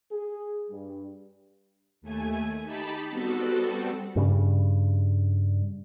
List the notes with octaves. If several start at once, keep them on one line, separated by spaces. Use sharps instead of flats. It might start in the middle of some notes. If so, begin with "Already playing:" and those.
G#4
G2 G3
D#2 A3 G#5
D#4 G4 A5 B5
G3 B3 C4 F#4 A4
G2 C#3 G3